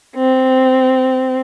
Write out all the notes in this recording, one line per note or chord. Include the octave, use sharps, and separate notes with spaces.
C4